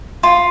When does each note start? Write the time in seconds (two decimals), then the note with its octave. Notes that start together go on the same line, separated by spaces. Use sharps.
0.23 F4